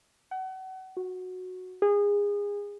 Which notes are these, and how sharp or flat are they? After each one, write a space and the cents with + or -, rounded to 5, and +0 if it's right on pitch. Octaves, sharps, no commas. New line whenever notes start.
F#5 +35
F#4 -10
G#4 -25